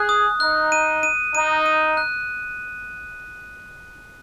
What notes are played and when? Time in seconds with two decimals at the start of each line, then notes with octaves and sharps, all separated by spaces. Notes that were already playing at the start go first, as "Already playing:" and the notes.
Already playing: G#4 F#6
0.09 D#6
0.40 D#4 F#6
0.72 D#7
1.03 D#7
1.34 D#4 D#7
1.66 D#7
1.97 F#6